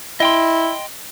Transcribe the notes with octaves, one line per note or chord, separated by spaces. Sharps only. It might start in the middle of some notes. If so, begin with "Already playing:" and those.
E4 D#5 G5 C6